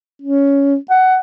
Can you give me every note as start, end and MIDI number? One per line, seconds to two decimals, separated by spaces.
0.22 0.76 61
0.90 1.19 78